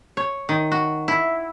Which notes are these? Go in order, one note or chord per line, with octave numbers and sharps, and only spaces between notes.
C#5
D#3
F#4
E4